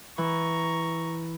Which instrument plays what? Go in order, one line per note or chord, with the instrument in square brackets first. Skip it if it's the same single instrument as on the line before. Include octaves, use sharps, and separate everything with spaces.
[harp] E3 [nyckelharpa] A#5 C#6